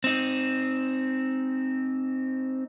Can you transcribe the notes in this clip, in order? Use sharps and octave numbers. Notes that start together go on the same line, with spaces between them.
C4 D#4